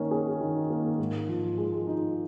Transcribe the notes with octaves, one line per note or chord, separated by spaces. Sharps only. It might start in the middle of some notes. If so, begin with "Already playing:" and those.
Already playing: D#3 A#3 C#4
G#4
D#3
A#3
G#2
F3
G#3
D#4